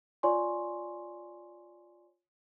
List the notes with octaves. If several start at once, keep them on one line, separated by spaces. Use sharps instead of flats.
F4 C#5 D5 G#5 C6 C#6